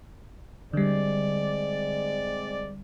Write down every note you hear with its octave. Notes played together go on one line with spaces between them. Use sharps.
D3 G3 G#3 C4 D5